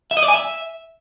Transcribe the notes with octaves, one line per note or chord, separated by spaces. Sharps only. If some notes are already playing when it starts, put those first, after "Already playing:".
E5
D#5
D5
G#5
E5